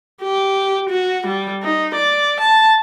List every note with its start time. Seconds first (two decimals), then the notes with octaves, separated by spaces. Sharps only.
0.23 G4
0.90 F#4
1.27 G3
1.63 D#4
1.95 D5
2.41 A5